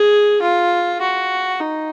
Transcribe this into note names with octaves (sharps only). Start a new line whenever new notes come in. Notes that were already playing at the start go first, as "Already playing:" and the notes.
Already playing: G#4
F4
F#4
D#4